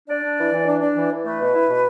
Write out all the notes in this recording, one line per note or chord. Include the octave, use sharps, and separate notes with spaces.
D4 D5
D4
E3
E3
D4
D4
E3
E3
A3 B4
B2
E4
B2